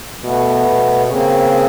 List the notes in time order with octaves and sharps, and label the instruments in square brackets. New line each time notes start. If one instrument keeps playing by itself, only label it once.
[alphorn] B2 [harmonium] A3 B3
[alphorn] B2
[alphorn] C#3 [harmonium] A#3 C4